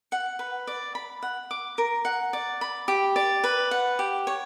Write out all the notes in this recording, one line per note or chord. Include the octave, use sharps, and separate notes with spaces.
F#5
B4
D5
B5
F#5
D6
A#4
F#5
D5
B5
G4
D5
B4
F#5
G4
C#5